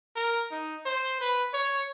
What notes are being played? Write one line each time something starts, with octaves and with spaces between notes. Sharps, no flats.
A#4
D#4
C5
B4
C#5